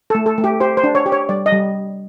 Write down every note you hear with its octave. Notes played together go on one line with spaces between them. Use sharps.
A3 A4
A4
A3
G4
G4 C5
C5
D4
C#5
G4
C#5
G3 D5
D#5
G3